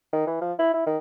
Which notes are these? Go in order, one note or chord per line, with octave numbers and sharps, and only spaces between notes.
D#3
E3
F3
E4
E4
D#3